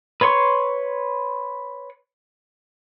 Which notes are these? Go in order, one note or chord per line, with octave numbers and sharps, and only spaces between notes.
B4 C#5 C6 C#6